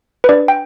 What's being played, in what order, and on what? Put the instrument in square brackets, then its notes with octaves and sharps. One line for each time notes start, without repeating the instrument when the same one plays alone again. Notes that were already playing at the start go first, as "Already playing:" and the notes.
[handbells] B4
D4 D5
G5